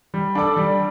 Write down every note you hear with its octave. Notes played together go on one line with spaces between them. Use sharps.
G3
D4 A4 D5
G3